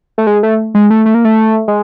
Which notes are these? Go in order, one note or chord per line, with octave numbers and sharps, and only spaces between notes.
A3
G#3
A3
G#3
A3
A3
A#3
A3
G#3